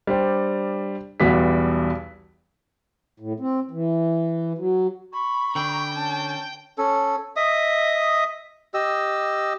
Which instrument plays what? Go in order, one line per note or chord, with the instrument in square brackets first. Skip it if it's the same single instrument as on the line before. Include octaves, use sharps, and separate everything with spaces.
[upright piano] G3 D4 C5 G5
B1 E2 G3 F#4 B4 B6
[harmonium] A2
C4
E3
F#3
[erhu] B5 [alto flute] C#6
[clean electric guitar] D3 [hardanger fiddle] G5
[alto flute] C#4 [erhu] A5
[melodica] C#4 A4
D#5 E5 D#6
G4 D#5 E6